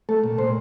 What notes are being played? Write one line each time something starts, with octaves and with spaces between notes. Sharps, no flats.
A3 A4
A#2
A#2 C5